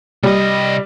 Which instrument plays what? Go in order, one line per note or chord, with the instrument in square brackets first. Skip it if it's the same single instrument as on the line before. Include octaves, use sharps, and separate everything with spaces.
[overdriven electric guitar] C2 D#5 [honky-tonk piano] G3